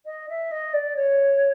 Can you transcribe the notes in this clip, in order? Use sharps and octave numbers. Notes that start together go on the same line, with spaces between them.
D#5
E5
D#5
D5
C#5